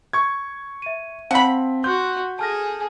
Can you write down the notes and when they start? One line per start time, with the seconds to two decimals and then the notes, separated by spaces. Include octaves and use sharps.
0.13 C#6 G#6
0.82 E5 D#7
1.31 C4 F5 F#5 A5 B5 B6
1.84 F#4 C6 F#6 G6
2.39 G#4 A4 A5 F6 A#6